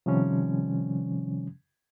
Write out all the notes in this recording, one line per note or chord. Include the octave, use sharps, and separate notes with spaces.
C3 D#3 F3 G3 C#4